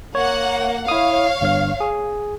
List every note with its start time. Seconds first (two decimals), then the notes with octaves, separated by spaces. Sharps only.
0.15 A#3 C#5 F#5
0.88 E4 C#5 F5 D#6
1.41 G1 G2 F6
1.80 G#4